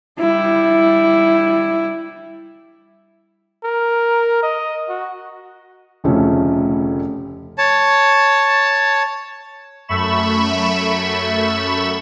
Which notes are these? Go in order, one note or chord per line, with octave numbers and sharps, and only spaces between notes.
G3 E4
A#4
D#5
F#4
F1 D2 C#3 F3 A3 C#4
C#5 A5
F#2 A3 E5 B5 C#6 E7